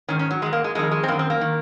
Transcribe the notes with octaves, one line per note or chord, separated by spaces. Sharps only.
G#2 D#3 C#4
C#4
F#3
G#2 D#3 G#3
A#3
G#3
F2 D#3 G#3
G#3
C4
F#2 D#3 A#3
C4
A#3
D#3